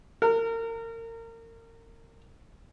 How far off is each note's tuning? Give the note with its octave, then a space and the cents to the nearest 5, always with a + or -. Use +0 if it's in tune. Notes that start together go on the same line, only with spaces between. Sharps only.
A#4 -30